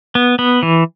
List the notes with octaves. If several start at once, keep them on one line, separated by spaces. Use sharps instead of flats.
B3
B3
E3